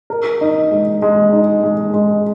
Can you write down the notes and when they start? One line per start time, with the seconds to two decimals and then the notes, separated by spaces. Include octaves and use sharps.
0.10 A#4
0.41 D#4
0.71 G#3
1.02 G#3
1.33 D#4
1.63 G#3
1.93 G#3